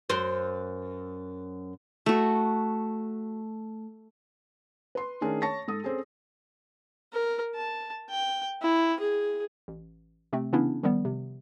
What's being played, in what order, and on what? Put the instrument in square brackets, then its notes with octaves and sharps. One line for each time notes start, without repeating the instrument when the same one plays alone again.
[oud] F#2 C5
[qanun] A3 F#4
[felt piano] B4 C6
D#3 A3 C#4 D4 G#4 A#4
C#5 A5 C#6 A#6
G#2 A4 D#6
C4 C#4 G#4 A4
[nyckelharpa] A#4
A5
G5
E4
G#4
[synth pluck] A1
C3 A3 C4
C#3 E3 B3 C#4 D4 E4
D#3 F3 G3 B3
C3